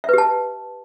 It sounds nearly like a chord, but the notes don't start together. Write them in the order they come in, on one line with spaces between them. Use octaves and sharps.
E5 B4 G4 A5